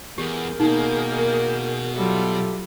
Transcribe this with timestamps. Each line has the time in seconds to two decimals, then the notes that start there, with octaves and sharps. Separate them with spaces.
0.18 E2 G4 G#4 A#4 G6
0.60 B2 D#3 A#3 D#4
1.94 F#3 G3 F4 G4 A4 E5